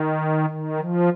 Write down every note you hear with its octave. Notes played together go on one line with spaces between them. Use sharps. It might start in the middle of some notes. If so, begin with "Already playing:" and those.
Already playing: D#3
D#3
F3